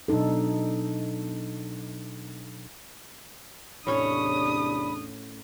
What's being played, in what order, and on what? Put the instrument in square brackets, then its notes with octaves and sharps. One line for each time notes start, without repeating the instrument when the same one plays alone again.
[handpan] B2 F#3 D4 D#4 A4
[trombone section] E2 C3 D4 [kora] A2 C#4 C#5 [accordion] B5 [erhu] D#6